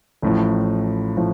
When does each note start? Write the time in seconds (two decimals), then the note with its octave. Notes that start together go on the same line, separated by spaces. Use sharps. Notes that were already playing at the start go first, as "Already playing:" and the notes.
0.22 A1 A2 F3
1.17 A2 F3